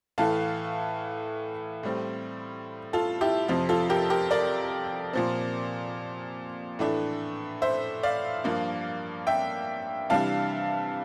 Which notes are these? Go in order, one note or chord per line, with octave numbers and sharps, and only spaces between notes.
A2 E3 A3 F5 A5
A2 G3 C4
F4 A4
E4 G4
F2 C3 F3 C4 F4
F4 A4
G4 A#4
G4 A#4
A#4 D5
A#2 F3 C4
A2 E3 A3 D4
C5 E5
D5 F5
G2 F3 A#3
E5 G5
C3 E3 G3 D4 F5 A5